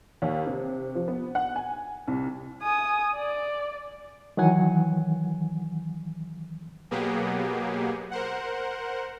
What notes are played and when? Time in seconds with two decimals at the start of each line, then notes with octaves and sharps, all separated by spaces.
0.22 D#2
0.47 C3
0.95 F3
1.08 B3
1.35 F#5
1.56 G#5
2.07 C2
2.63 G#5 D#6
3.17 D5
4.37 D#3 E3 F#3 F#5 G#5
6.91 B2 F#3 A#3 B3 G4 G#4
8.11 A#4 C5 F#5